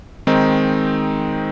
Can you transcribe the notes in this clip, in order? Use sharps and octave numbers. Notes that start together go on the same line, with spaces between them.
D#3 G#3 C4 D#4